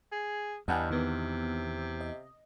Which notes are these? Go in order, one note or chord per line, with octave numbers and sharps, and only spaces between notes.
G#4
E2 G2 D#5 F#5 G#5
C3 D#3 B3
D#5